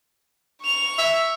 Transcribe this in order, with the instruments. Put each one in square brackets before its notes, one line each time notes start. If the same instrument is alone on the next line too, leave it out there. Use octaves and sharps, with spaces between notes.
[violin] C#6 F7
[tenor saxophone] E5